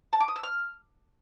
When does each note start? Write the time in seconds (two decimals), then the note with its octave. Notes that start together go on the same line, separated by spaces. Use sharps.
0.13 A5
0.20 D6
0.28 D#6
0.36 E6
0.43 F6